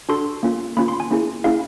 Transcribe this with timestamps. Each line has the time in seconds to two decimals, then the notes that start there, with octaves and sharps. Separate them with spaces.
0.09 D4 F#4 A4 C6
0.43 A#3 C#4 F4
0.77 A#3 C#4 F4 B5
0.88 C6
1.00 G#5
1.11 A#3 C#4 E4 G#4
1.44 A#3 C#4 E4 G#4 F5